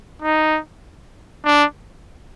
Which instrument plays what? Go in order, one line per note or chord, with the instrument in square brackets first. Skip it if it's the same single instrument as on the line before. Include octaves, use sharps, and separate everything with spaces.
[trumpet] D#4
D4